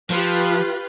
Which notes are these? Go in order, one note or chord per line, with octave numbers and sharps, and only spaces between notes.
F3 F4 G4 B4